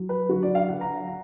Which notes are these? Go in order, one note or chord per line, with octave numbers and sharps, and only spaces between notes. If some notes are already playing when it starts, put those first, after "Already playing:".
Already playing: F#3
B4
D3 F#3 F#4
D5
F5
D3 F#3 F#5
A#5
A#5